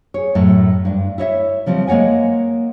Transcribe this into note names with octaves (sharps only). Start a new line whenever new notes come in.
G#4 C#5
F#2 A2
G2 D4
E4 C#5 D#5 E5
C#3 F3 G3 C4
G#3 A#3 C#5 F#5 G#5